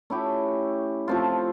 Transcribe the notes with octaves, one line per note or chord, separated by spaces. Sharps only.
A3 C#4 E4 G4
F3 A3 C4 F4